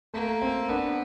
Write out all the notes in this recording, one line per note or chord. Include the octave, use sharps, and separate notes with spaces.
A3 A#3
C4
B3 D4